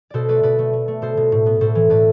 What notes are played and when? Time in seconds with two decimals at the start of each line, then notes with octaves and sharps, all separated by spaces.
0.10 B2 A4 C5 D5
0.29 A3 B4 D5
0.43 B2 B4 D5
0.59 A3
0.73 A3
0.88 A3
1.02 B2 A4 C5
1.17 B2
1.32 A2
1.46 B3
1.61 A2 A4 C5
1.75 E3
1.90 A2 B4 D5